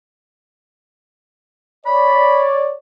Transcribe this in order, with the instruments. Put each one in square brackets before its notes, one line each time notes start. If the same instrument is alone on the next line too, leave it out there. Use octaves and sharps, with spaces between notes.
[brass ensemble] C#5 D5 [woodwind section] B5